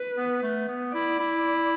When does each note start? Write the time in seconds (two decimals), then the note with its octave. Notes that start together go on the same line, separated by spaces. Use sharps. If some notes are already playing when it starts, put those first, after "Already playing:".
Already playing: B4
0.17 B3
0.43 A3
0.68 B3
0.94 E4 D5
1.20 E4